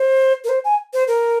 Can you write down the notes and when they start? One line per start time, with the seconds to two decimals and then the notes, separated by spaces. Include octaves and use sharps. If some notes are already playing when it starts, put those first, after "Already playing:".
Already playing: C5
0.45 A#4
0.49 C5
0.64 G#5
0.93 C5
1.08 A#4